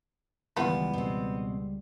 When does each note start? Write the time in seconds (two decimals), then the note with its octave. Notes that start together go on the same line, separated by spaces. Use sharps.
0.57 C#2 D#3 E3 G3 B3 E4 F4 B4
0.93 B2 C4